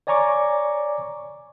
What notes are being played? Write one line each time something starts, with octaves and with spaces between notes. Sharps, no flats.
C#5 D5 G#5 A#5 C#6 D6